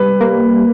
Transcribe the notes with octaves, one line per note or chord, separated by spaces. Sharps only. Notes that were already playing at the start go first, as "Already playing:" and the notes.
Already playing: G3 B4
A#3